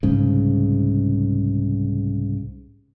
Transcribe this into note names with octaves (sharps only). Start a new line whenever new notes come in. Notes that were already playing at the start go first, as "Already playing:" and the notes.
C2 G#2 C#3